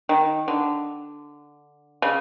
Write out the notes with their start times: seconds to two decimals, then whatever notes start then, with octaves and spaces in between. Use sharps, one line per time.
0.09 D#3
0.48 D3
2.02 C#3